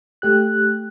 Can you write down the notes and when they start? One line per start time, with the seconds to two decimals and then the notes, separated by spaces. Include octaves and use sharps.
0.22 A3 G4 F#6